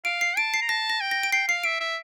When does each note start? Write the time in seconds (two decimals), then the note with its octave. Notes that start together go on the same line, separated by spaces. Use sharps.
0.05 F5 D7
0.21 C7
0.37 A5 D7
0.54 C7
0.62 A#5
0.69 A5 A#6
0.90 A#6
1.01 G5
1.11 A#6
1.23 D7
1.32 G5 C7
1.48 F5 C7
1.64 E5 D7
1.80 E5